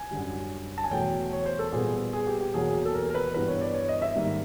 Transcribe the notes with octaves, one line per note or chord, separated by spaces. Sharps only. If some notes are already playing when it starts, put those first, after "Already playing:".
Already playing: G#5
F#2 D3 G3
A5
G#5
E2 B2 F#3 A3 G5
C#5
C5
A4
A#2 G3 B3 G#4
G#4
G4
G4
E2 B2 F#3 A#3 G#4
A4
A#4
A#4
B4
G2 E3 G3 B3 B4
C#5
D5
C#5
D#5
E5
G#2 D#3 G3 A#3